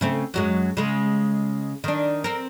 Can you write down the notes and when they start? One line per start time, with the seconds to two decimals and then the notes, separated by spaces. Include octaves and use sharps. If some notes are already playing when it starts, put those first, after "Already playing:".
0.01 C#3 A3 C4
0.34 F#2 F#3 G#3
0.77 C#3 G#3
1.84 D#3 D4
2.24 C4 A#4